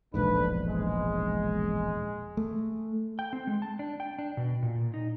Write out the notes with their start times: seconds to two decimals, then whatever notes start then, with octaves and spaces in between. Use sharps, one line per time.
0.14 E1 A#1 G#2 A3 D4 B4
0.66 G#3
2.37 A3
3.19 G5
3.33 C4
3.47 G#3
3.62 A5
3.79 D4
4.00 G5
4.19 D4
4.37 B2
4.62 A#2
4.94 D#4